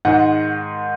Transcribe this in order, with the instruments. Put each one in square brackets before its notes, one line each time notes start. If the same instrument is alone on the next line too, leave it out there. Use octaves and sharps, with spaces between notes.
[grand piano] G#2 D#3 G#3 D#4 F#5